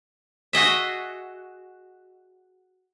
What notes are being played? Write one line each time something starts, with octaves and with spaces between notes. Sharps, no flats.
F#4 G#4 D#5 E5